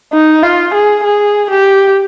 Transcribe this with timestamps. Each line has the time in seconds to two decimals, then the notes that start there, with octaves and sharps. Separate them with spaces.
0.12 D#4
0.43 F4
0.74 G#4
1.04 G#4
1.50 G4